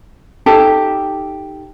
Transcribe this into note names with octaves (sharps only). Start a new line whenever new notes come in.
D#4 G4 A4 A5